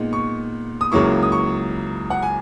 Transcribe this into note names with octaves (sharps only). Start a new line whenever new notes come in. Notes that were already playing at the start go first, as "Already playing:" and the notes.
Already playing: A#2 G#3 B3 D#4
C#6
D#6
C#2 C#3 F#3 A#3 E4 C#6
D#6
C#6
F#5
G#5